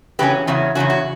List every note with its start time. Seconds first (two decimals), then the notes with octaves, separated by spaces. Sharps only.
0.19 E2 C#3 F#3 C#4 G4 B4
0.47 E2 C#3 F#3 C#4
0.75 E2 C#3 F#3 C#4 F#4
0.90 F#4